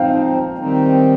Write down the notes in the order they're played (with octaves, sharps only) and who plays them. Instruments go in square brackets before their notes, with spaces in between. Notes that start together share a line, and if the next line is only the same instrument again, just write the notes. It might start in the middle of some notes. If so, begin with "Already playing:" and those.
Already playing: [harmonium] F3 C4 D#4 [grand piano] F5 G5
[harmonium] D#3 G3 C4 D#4